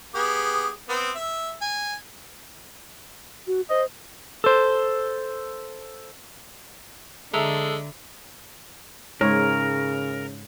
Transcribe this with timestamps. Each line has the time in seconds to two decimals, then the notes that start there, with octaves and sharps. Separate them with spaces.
0.15 B3 G4 G#4
0.89 B3 C4
1.15 E5
1.61 G#5
3.47 F#4
3.70 C5 D#5
4.44 A4 C5
7.34 D3 G#3 A4 E5 A#5 E6
9.21 G#2 C#3 A#4 C#5